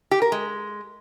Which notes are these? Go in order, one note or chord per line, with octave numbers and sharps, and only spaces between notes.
G4
A#4
G#3